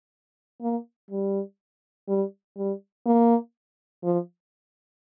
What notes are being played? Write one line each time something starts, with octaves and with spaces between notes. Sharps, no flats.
A#3
G3
G3
G3
A#3
F3